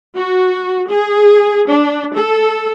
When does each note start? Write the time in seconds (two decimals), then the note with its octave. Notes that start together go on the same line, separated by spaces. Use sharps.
0.15 F#4
0.90 G#4
1.69 D4
2.15 A4